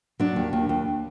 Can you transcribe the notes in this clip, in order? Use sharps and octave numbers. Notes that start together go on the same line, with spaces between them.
F#3 D4
D#2
D#2
D#2